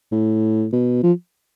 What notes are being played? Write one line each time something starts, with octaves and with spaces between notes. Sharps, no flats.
A2
B2
F3